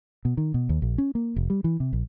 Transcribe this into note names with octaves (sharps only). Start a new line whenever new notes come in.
B2
D#3
B2
D#2
A#1
C#4
A#3
F1
G3
E3
C3
A#1